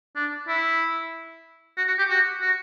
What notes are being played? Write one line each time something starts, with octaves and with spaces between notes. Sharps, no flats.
D4
E4
F#4
F#4
G4
F#4
F#4